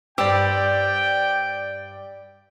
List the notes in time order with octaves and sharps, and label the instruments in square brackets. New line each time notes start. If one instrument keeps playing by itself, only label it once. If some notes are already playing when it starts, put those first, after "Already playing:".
[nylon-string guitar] G2 C5 [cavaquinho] G4 [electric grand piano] D5 E6 [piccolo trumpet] G5